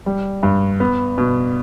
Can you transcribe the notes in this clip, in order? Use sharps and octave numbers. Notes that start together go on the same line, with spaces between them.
G3
G2
B3
B2